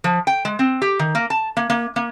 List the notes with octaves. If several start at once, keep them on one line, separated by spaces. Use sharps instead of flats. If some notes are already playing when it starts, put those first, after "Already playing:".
F3
G5
G#3
C4
G4
D#3
A#3
A5
A#3
A#3
A#3